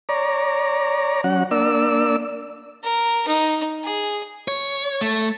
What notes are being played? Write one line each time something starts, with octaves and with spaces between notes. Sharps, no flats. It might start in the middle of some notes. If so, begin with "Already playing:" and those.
C#5 D5 A#5
F#3 C#4 F#5
A#3 D4 D5 E6
A#4
D#4
G#4
C#5
A3